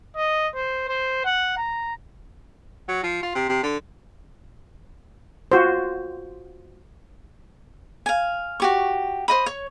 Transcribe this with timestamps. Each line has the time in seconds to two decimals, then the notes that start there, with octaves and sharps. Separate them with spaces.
0.16 D#5
0.55 C5
0.88 C5
1.25 F#5
1.57 A#5
2.89 F#3
3.03 F3
3.23 F4
3.35 C3
3.49 C3
3.64 D3
5.52 F4 F#4 C5
8.06 F5 G#5
8.60 F#4 G4 C#6
9.28 C5 D#5 B5
9.46 C#5 C#6